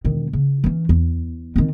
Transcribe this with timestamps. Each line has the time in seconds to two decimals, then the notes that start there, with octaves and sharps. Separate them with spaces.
0.05 E1 D#3
0.33 C#3
0.64 E3 C#4
0.89 E2
1.56 D#3 C4